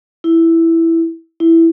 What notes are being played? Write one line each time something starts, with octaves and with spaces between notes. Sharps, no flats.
E4
E4